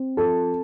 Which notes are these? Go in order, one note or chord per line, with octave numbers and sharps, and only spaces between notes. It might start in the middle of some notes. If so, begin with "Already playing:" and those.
Already playing: C4
F3 A4